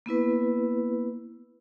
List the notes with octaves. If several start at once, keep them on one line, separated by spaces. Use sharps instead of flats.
A#3 B3 E4 B4